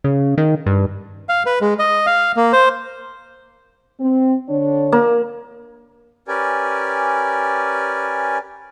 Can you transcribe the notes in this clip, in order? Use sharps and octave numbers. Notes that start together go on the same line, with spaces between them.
C#3
D#3
G2
F5
B4
G#3
D#5
F5
A#3
C5
C4
D3 D4 C#5
A#3
C#4 G4 A#4 B4 D5 G#5